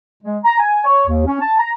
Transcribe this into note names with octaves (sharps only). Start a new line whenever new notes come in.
G#3
A#5
G#5
C#5
D#2
C#4
A5
A#5